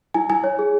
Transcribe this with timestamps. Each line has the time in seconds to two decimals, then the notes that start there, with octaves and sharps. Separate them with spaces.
0.14 E4 G#5
0.30 E4 G#5
0.44 C#5
0.59 G#4